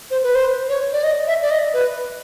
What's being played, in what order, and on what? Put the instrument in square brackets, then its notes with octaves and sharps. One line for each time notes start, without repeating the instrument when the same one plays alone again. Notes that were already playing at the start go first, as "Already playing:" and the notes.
[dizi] C5
B4
C5
C#5
D5
D#5
E5
D5
D#5
B4